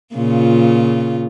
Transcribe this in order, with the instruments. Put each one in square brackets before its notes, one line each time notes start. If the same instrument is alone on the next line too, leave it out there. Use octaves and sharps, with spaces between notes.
[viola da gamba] A#2 C#3 F4